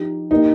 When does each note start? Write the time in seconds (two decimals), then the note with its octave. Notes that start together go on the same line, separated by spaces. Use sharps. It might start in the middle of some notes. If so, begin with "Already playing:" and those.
Already playing: F3 D#4 G4
0.31 A#2 A#3 D#4 G4